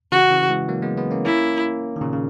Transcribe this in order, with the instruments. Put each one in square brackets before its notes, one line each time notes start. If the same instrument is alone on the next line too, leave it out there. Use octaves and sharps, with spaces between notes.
[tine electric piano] C#3 E3 [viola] F#4
[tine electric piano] C#3 E3
E3 G#3
F#3 A#3
G#3 B3
G#3 B3
A#3 C#4
[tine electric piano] A#3 C#4 [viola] E4
[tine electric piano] D#3
A#2 C#3
C#3